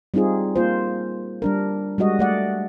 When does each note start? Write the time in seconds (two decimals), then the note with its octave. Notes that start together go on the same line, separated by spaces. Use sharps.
0.14 G3 C4 D#4 F4 G#4
0.56 A#3 F4 C5
1.42 G3 D4 A#4
1.98 G3 G#3 F#4 D#5
2.19 A3 D5 F#5